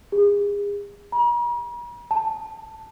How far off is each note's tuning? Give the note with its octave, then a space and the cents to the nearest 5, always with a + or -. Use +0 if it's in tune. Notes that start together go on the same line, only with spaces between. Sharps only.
G#4 -35
A#5 +45
A5 +5